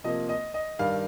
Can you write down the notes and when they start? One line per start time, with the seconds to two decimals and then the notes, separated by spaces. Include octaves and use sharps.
0.04 C3 F3 A#3 D#5
0.29 D#5
0.54 D#5
0.79 G2 D#3 G3 F5